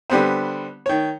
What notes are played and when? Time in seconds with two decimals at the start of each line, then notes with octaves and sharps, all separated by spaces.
0.10 D3 G3 B3 C4
0.86 D#3 C#5